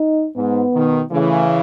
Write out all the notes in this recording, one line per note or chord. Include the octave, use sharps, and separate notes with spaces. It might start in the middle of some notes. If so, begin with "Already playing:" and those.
Already playing: D#4
G#2 B3
B2 D#3
C#3 E3 A3